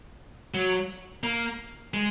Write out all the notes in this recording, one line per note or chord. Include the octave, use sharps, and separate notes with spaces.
F#3
A#3
G#3